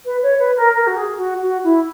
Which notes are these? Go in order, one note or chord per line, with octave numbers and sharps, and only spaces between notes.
B4
C#5
B4
A#4
A#4
F#4
G#4
F#4
F#4
E4